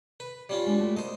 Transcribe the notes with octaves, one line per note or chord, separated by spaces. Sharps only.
B4
G3 C#4 F4
G#3 D4 B4
G#3 A3 F#4
A#3 C5 D#5